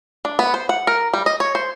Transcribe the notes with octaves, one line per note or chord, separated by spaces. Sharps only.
D4
B3
C5
F#5
A#4
G3
D#5
C#5
C5